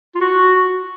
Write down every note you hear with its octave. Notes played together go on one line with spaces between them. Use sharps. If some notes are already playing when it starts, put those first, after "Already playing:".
F4
F#4